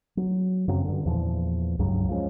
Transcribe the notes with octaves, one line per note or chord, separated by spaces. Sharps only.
F#3
F#2 C#3 F#3 C4
G2 D3
E2 A#2 E3 F3
C#2 G2 C#3 F#3
F3 G#3 B3 C#4